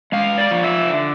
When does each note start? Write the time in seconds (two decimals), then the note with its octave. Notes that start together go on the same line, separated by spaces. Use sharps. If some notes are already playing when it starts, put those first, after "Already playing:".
0.12 G#3 F5
0.38 D5
0.51 F3
0.63 E5
0.89 D3